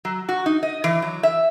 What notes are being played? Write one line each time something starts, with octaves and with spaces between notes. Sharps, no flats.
F#3
F#4
D#4
D#5
E3
F#3
E5